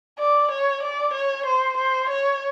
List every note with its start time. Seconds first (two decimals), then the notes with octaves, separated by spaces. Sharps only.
0.19 D5
0.51 C#5
0.83 D5
1.13 C#5
1.46 C5
1.77 C5
2.09 C#5